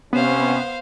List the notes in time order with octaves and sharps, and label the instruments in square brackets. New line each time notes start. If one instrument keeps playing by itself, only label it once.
[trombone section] C3 C#4 [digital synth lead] B3 [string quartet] C5 F5